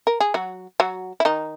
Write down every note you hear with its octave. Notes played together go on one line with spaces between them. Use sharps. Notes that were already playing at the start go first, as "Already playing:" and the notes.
A#4
G#4
F#3 F#4
F#3 F#4
E4
D#3 D#4